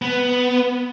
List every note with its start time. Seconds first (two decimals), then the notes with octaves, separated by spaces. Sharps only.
0.02 B3